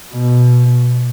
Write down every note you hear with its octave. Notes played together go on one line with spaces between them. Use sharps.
B2